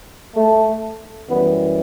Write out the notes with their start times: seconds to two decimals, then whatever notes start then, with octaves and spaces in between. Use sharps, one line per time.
0.36 A3
1.28 F#2 E3 G3 B3